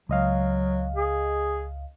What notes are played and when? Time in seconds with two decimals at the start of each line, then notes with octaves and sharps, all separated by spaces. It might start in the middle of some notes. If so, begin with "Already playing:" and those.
0.09 C#2 F#3 D#5 F5
0.96 G#4